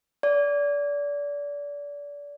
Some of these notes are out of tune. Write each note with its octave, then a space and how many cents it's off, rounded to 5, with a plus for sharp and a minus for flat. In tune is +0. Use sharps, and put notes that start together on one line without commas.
D5 -30